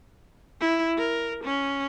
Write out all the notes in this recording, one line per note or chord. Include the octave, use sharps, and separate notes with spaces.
E4
A#4
C#4